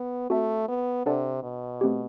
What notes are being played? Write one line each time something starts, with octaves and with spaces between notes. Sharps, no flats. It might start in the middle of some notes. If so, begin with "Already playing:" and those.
Already playing: B3
A3 C4 F#4 A4 E5 A5
B3
C3 D4 A4 D5 F#5 A5
B2
A3 C4 G4